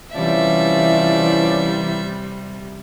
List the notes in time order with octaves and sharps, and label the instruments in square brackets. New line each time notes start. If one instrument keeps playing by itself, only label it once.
[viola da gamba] C3 G3 [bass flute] E3 [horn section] F3 C#4 D5 [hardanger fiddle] E5